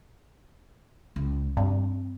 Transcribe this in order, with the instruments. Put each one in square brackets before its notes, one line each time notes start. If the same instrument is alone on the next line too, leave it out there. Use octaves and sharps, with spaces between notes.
[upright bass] C#2
[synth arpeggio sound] G2 [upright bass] C4